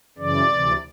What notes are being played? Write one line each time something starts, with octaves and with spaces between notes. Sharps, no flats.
F#2 C#3 E3 D5
D2 C3 E3